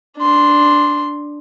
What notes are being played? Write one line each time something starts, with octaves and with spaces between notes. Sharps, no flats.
D4 C6